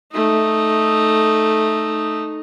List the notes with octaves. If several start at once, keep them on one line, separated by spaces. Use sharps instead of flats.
A3 D#4